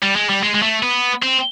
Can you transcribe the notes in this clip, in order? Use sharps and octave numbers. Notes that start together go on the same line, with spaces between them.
G3
G#3
G3
G#3
G#3
A3
B3
C4